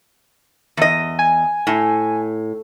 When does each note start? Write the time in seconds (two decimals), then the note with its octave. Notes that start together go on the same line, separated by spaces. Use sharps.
0.77 E2 D#5
1.19 G#5
1.67 A2